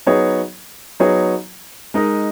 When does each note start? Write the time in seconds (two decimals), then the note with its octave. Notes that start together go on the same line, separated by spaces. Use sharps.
0.07 F#3 B3 D#4 G#4 C#5
1.00 F#3 B3 D#4 G#4 C#5
1.94 G#3 D#4 A#4 D#5